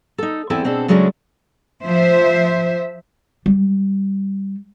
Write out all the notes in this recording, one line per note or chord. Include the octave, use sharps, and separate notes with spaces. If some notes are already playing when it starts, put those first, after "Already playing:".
D#4 A4
E2 C4 E4 A4 G#5
B2 C4 D4 G#4 A4
C#3 F#3 G#3 A3 C#4 D4
F3 C5 E5
G3